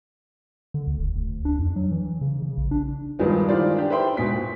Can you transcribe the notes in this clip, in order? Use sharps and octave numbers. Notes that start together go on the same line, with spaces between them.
D3
D2
D#1
D2
D4
F2
F#3
E3
C#3
C#3
A#1
D4
G2 D#3 F3 G#3 B3
D#3 E3 F4 C5 D5
D4 G4
B4 C5 E5 G5 C6
G#2 B2 G#5 B6
A#2